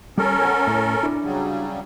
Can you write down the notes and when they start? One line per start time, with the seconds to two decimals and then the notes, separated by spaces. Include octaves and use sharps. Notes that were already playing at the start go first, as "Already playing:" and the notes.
0.18 G3 C#4 A4 A#4
0.42 F#5 G#5
0.67 A2
1.03 D4 E4
1.23 C#3 F#3 G3